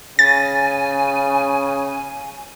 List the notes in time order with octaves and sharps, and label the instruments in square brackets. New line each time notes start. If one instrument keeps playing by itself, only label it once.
[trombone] C#3 [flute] G#5 [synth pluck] A6